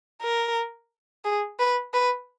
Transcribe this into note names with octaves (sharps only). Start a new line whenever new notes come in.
A#4
G#4
B4
B4